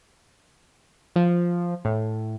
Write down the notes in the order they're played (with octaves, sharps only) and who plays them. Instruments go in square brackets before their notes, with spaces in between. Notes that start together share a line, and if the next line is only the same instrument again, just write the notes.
[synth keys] F3
A2